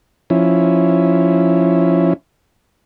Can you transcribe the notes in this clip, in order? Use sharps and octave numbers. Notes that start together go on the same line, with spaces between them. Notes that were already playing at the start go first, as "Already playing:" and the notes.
F3 C#4 E4